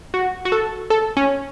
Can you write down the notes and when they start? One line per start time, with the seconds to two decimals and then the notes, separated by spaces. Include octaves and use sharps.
0.14 F#4
0.45 F#4
0.52 A4
0.90 A4
1.17 C#4